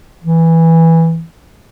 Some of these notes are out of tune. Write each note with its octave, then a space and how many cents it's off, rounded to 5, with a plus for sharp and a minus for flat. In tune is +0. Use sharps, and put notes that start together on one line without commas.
E3 -5